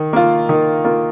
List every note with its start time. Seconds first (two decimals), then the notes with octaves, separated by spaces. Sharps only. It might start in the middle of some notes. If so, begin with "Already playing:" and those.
Already playing: D#3
0.13 A#3 F4
0.49 D#3
0.84 A#3 F4